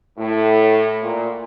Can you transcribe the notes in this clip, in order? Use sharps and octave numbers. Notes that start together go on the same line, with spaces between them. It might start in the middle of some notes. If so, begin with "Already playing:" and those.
A2
A#2